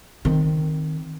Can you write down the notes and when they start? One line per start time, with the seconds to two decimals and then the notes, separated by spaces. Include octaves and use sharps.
0.25 D#3 C4